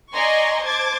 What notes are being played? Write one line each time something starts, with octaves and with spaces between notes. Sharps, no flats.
D5 D#5 G#5 A#5 C6 C#6
C5 A5 D6 G#6 A6